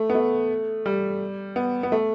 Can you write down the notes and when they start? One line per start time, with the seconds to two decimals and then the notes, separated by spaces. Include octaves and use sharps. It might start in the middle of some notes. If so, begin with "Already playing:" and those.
Already playing: A3
0.10 B3
0.15 A3
0.86 G3
1.56 B3
1.83 B3
1.92 A3